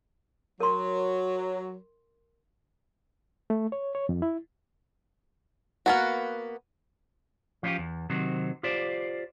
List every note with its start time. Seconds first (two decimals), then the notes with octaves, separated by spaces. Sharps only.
0.60 F#3 A#4 C6
3.50 A3
3.72 C#5
3.95 C#5
4.09 F2
4.22 E4
5.86 A#3 B3 F#4
7.63 F3 C#4 D4 E4 F4 G4
7.78 E2
8.10 C3 D#3 F#3 C4
8.63 F4 G4 C5 D5